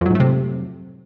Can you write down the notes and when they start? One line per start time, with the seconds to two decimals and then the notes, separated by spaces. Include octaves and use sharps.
0.01 F2
0.06 F#3
0.10 G#2
0.15 A3
0.20 C3